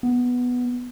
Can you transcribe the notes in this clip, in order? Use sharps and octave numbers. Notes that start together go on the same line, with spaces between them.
B3